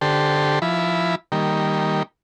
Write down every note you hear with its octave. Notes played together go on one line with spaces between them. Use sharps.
D3 G4 A4 C5
F3 E4 B5
D#3 G3 A#3